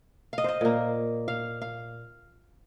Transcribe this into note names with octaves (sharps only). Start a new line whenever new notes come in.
D#5 F5
C5 D#5
A#2 A#3
F5
F5